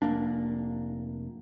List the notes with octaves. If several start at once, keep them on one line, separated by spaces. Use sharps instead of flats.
F1 A#3 D4